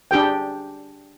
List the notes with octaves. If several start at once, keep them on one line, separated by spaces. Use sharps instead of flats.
D4 G4 G#4 G5